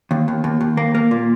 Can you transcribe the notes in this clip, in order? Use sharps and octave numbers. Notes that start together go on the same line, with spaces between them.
D#2
D#2
D#2
D#2
A#3
A#3
A#2